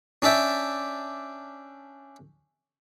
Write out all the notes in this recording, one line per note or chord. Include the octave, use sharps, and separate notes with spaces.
C#4 D4 D5 E5 G5